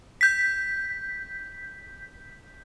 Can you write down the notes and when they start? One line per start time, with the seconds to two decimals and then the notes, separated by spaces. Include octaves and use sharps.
0.21 G6 B6